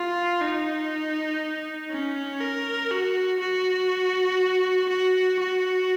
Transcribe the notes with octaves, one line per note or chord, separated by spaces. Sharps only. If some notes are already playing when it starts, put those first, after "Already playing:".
Already playing: F4
D#4
C#4
A#4
F#4
F#4
F#4
F#4